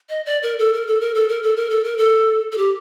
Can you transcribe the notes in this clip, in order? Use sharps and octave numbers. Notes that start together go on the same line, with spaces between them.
D#5
D5
A#4
A4
A#4
A4
A#4
A4
A#4
A4
A#4
A4
A#4
A4
A4
G4